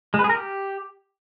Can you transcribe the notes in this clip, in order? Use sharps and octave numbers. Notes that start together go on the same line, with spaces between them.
G#3
B4
G#4
A#4
G4